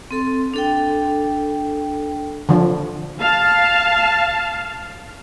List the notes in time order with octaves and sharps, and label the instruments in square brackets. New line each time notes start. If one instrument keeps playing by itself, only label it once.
[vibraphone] C4 A4 C6
D4 A4 G5
[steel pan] D3 F3
[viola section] F5 A5